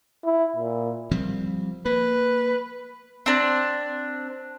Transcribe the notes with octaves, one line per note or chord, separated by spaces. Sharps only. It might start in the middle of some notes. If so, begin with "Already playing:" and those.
E4
A#2
F3 G3 C4
A#3 B4
C4 D4